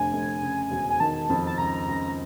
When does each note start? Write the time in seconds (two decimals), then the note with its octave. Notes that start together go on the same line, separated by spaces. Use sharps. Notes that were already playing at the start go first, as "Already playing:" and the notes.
Already playing: F1 D3 G#5
0.13 F1
0.41 C#3
0.70 E1
0.90 G#5
1.00 D#3 A5
1.29 F2
1.47 A5
1.58 C#2 A#5
1.88 C#2